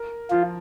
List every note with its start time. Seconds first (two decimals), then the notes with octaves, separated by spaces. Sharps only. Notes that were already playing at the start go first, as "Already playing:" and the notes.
Already playing: A#4
0.30 F3 F4